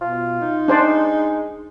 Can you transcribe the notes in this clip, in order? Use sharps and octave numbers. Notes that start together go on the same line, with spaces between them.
B2 F4
D#4
G#3 D4 C5 D5